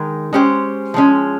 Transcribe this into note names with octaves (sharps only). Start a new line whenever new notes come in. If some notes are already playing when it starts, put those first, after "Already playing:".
Already playing: D#3 G#3 D#4 A#4
G#3 C#4 G4 C5
F3 G#3 C#4